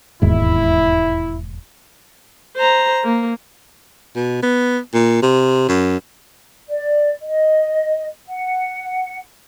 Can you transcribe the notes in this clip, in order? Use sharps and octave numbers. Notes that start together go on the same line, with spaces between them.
E1 D#2 G#2 E4
C5 A#5
A#3
B2
B3
A#2
C3
F#2
D5
D#5
F#5